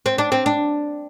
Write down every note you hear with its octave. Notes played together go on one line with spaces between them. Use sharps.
C4
D4
C4
D4